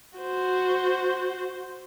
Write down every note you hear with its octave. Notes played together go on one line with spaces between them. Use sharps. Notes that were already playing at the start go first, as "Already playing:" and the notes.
F#4 C5